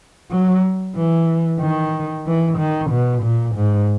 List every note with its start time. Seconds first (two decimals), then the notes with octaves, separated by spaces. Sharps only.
0.31 F#3
0.96 E3
1.61 D#3
2.26 E3
2.58 D#3
2.91 B2
3.23 A#2
3.55 G#2